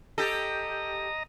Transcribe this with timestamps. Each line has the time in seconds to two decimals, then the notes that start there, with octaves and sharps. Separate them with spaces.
0.18 G4 A4 D#5 A#5